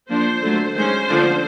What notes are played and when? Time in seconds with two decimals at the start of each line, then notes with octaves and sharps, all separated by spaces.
0.09 F3 A#3 D4 C5
0.42 D3 F#3 A3
0.74 D#3 G#3 C#4 C5
1.07 D3 F3 A#3 D4